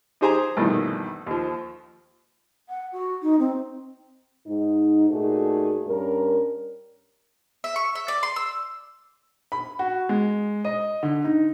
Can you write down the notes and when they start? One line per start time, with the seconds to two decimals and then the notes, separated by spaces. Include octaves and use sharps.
0.21 D#4 G4 G#4 C5 G#5 A#5
0.57 A#1 G2 B2 D#3 E3 A3
1.26 D#2 F3
2.69 F#5
2.93 F#4
3.22 D#4
3.39 C4
4.47 G#2 D#4
5.10 A#2 A3 D#4 F#4 G#4
5.88 G2 C#4 A#4
7.64 E5
7.76 C#6
7.95 E5
8.08 D5
8.23 C6
8.36 E6
9.52 B5
9.79 F#4
10.09 G#3
10.65 D#5
11.03 D3
11.24 D#4